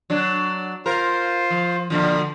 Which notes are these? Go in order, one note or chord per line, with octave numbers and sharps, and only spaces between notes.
F#3 D4
F4 A#4 C5
F3
A#2 D3 F3